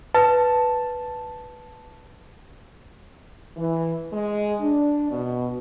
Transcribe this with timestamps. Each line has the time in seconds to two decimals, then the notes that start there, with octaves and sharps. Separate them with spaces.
0.14 B4 A5
3.57 E3
4.13 G#3
4.60 D4
5.11 B2